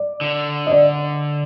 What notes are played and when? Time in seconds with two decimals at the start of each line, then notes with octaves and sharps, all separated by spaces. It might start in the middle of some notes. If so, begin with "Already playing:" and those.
Already playing: D5
0.21 D3
0.67 D#5
0.72 D5